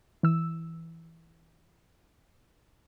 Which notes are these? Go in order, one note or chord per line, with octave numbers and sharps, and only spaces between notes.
E3 E6